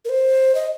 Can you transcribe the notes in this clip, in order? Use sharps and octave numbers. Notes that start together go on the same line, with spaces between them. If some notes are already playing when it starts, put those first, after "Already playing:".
A#4
C5
D#5